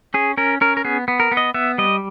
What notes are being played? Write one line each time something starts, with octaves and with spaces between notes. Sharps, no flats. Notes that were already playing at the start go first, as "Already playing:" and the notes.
C#4 G#4
C#4 A#4
C#4 A#4
A#4
B3 G#4
B3
A#4
B3
D#5
B3 E5
G3 D#5